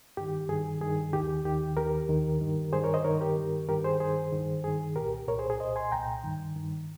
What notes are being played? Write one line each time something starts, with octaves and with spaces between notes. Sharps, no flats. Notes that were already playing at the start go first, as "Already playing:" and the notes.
G2 D#3 G4
G2 D#3 G#4
G2 D#3 G#4
D#2 D#3 G4
D#2 D#3 G4
D#2 D#3 G4 A#4
D#2 D#3
G2 D#3
G2 D#3 G#4 C5
A#4 C#5
C5 D#5
G2 D#3 A#4 C#5
G4 A#4
G2 D#3
G2 D#3 G4 A#4
G#4 C5
G2 D#3 G#4 C5
G2 D#3
G2 D#3 G#4
C2 A#2 G4 A#4
C2 A#2 A#4 C#5
G#4 C5
G#4
C2 A#2 C5 D#5
G#5 C6
C2 A#2 G5 A#5
G2 D#3
G2 D#3